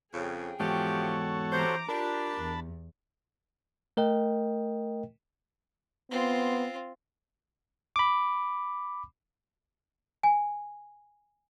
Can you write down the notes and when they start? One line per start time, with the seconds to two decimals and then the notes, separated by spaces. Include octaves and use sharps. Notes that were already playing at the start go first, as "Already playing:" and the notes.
0.14 F2 C#3 G#4 G5
0.60 E2 G#2 F3 F#4 G4 A4 C#5
1.52 C3 E3 C5 A#5 D6
1.89 D4 F4 G4 A#4 A5 B5
2.36 E2
3.97 A3 A#4 D#5 G5
6.11 B3 C4 F4
7.96 B5 D6
10.23 G#5